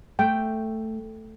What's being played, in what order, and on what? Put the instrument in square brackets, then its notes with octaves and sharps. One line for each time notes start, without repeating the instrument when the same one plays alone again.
[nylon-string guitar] A3 [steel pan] G5